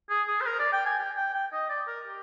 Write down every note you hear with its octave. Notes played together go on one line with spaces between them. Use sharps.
G#4
G#4
C5
A#4
D5
G5
G#5
G5
G5
G5
D#5
D5
A#4
G4